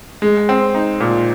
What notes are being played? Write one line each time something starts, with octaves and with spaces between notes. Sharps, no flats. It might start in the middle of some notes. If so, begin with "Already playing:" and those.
G#3
C4
D#4
A#2